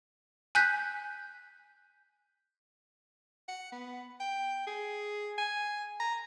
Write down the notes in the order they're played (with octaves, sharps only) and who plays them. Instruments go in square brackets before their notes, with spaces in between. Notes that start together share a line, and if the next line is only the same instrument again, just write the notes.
[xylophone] G#5 F#6 G6 B6
[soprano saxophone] F#5
B3
G5
G#4
G#5
A#5